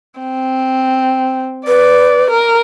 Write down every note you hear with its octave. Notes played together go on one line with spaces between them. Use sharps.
C4
B4 D5
A#4